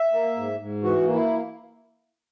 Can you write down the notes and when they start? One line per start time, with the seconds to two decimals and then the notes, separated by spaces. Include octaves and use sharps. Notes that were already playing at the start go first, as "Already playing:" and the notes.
Already playing: E5
0.13 A#3
0.37 G#2
0.60 G#2
0.83 E3 F#4
1.07 A#3
1.14 E4